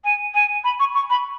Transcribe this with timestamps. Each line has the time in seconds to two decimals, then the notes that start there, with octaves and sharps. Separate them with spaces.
0.04 G#5
0.34 G#5
0.64 B5
0.80 C#6
0.95 C#6
1.10 B5